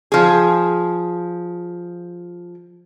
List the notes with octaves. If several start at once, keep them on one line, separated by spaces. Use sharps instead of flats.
F3 G#4